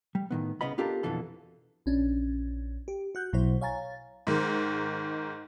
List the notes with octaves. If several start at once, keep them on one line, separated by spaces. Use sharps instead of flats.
G3
A2 D#3 B3
C2 C#3 B3 D#5 B5
B3 D4 F4 G4 A4 A#4
F2 B2 D3 E3 A4
A#1 C#4 D4
G4
F#4 F#6 G6
B1 B2 F#3 E4 C5
C#5 F5 G#5 A#5 A6
G#2 D#3